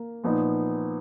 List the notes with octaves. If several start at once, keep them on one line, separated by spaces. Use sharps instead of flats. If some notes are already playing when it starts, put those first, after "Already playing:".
Already playing: A#3
A#2 F3 B3 D#4